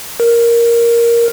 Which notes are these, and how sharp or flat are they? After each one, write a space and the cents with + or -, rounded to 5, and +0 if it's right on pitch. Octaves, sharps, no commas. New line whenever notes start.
A#4 +5